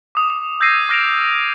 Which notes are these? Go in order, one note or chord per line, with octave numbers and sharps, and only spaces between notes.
D6 D#6
D#6
E6 G6 G#6 A#6 C7 D#7
D6 F6 A#6 D7 E7 F7